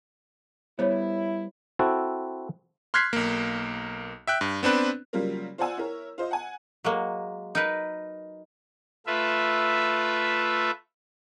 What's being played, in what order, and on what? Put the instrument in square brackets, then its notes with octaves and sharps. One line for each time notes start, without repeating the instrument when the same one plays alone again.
[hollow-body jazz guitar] G3 B3 [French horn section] E4 [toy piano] C5 C#5
[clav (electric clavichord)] C4 E4 F#4 A4
[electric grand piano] C6 F6 F#6 G#6 B6 C7
B1 A#3
E5 G5 F#6
G2
B3 C4 D4 B4
[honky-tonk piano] C#3 F#3 G3 A#3 F4 A#4
F4 C5 D5 F#5 G#5 E6
E4 A#4 C#5
F4 C5 D#5
F#5 G#5
[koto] F#3 G#3 A#3
D#4 A#4 B4
[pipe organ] A3 F4 B4 E5